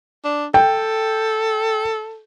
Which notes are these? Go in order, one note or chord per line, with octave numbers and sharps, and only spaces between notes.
D4
A4 G5